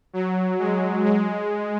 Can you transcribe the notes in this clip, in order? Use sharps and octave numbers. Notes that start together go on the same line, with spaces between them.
F#3
G#3
G#3